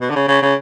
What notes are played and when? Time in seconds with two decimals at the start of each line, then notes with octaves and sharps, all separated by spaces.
0.01 B2
0.10 D3
0.15 C#3
0.28 C#3
0.42 C#3